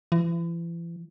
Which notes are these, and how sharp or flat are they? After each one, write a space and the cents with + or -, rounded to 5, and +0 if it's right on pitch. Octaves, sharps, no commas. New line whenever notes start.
E3 +40